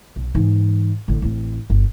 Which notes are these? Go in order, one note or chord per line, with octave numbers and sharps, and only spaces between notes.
B1
G#2 E3
A1 D3
A1 C4
G1